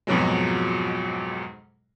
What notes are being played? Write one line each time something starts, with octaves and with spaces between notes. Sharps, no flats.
F2 G#2 B2 F3 F#3 G#3